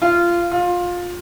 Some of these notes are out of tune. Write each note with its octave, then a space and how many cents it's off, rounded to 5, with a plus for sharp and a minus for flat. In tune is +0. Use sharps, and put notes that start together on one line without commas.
F4 -15
F4 +20